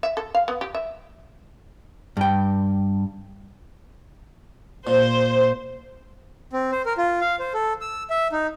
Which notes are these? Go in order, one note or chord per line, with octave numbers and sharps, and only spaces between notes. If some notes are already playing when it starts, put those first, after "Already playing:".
E5
A4
F5
B3
G4
E5
G2 G5
A#2 C5
C4
C5
A#4
F4
F5
C5
A4
E6
E5
D#4